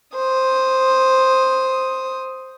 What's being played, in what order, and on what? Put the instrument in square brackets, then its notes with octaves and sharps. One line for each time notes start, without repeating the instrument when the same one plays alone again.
[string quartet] C5 D#6